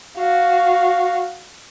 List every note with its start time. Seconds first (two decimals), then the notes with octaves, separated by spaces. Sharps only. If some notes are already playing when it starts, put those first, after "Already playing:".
0.18 F#4 F5